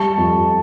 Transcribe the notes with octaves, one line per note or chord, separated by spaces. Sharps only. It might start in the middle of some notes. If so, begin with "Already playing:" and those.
Already playing: G3 A5 C#6
F2